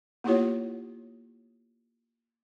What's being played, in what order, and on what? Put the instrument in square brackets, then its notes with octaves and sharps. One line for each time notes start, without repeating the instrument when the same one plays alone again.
[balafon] A#3 B3 E4 F4 G4 C#5